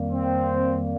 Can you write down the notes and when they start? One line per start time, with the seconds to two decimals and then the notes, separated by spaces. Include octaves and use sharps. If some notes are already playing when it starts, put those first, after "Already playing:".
Already playing: F2 D#3 G3 A#3
0.10 C4